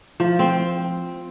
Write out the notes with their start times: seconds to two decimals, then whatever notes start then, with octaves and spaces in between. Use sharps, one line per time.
0.20 F3
0.39 C4